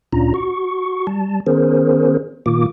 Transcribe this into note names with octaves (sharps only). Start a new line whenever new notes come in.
D2 A#2 C#4 D4 F4 A#5
F#4 C#6
G3 A5
D#3 B3 C#4 G#4 A#4 C5
A#2 D#3 A#3 F4 D6